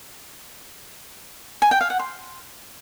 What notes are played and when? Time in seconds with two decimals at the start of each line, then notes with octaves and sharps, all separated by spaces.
1.62 G#5
1.71 G5
1.81 F5
1.90 F#5
1.99 C6